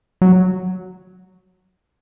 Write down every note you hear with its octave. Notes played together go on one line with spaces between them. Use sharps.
F#3